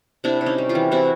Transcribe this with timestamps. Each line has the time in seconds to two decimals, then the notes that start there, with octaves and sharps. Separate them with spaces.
0.24 C3 D4 E4
0.41 C3
0.46 C#4 D#4
0.58 G3
0.69 F4 G4
0.75 E3
0.91 C3 E4 F#4